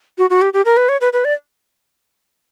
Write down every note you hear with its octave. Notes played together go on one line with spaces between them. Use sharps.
F#4
F#4
G4
G4
A#4
B4
C#5
B4
B4
D5